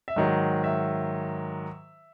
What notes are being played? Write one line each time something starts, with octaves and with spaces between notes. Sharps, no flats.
E5
G#2 D#3 F#3 D#5
E5